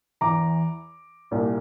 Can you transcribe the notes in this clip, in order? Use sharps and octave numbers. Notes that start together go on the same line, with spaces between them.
E2 E3 A#5 D6
C2 A#2